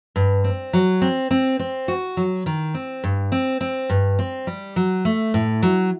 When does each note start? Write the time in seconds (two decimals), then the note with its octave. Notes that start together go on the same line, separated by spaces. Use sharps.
0.16 G2
0.44 C4
0.73 F#3
1.01 C4
1.31 C4
1.59 C4
1.88 F#4
2.17 F#3
2.46 D#3
2.74 C4
3.04 G2
3.32 C4
3.61 C4
3.90 G2
4.19 C4
4.47 G3
4.76 F#3
5.05 A3
5.34 A2
5.62 F#3